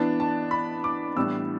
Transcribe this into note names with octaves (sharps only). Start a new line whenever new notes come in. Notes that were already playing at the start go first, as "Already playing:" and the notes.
Already playing: E3 B3 D4 A5
A5
B5
D6
A2 E3 G3 B3 D4 E6